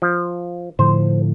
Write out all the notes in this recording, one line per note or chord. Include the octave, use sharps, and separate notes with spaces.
F3
A2 D3 F3 C5